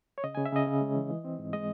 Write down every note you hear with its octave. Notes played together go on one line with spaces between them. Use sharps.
C#5
C#3 D#5
C#3 G#5
E5
C#3 D#5
C#3
G#3
E3
E3
C4
G#2
G#3 D#5